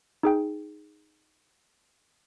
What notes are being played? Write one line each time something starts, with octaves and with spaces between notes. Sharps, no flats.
D#4 G#4 G5